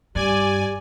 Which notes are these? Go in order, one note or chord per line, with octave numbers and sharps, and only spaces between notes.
G2 G4 D5 G#5